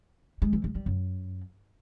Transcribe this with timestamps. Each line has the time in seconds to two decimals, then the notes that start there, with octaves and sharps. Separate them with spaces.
0.42 G#3
0.53 E3
0.64 G#3
0.75 G3
0.86 F#2